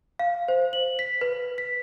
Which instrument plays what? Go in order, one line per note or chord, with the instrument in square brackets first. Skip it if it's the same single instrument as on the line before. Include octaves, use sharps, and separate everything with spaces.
[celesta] F5
C5
F#7
B6
B4
B6